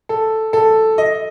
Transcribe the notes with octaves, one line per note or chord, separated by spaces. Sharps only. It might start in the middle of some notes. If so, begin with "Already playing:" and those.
A4
A4
D#5